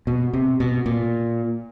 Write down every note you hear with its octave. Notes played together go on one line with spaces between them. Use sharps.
B2
C3
B2
A#2